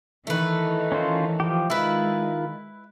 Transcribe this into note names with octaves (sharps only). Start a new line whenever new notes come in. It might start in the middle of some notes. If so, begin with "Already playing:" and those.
D#3 E3 A3 B4
C#4 F4 C5
F3 G4
D#3 G#3 E4 F4 B4 B5